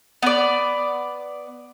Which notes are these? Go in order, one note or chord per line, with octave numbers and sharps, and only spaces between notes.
B3 D5